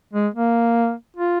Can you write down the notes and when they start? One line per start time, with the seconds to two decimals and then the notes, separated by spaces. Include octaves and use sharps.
0.13 G#3
0.34 A#3
1.17 F4